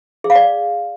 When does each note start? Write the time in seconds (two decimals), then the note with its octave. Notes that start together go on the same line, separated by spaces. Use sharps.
0.24 G#4
0.30 F5
0.35 D5